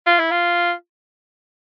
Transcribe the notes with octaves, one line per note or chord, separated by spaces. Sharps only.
F4
E4
F4